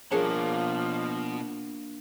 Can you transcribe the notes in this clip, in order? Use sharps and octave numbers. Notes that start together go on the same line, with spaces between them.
B2 F3 A#3 D4 G#4 A#4 C#5 A5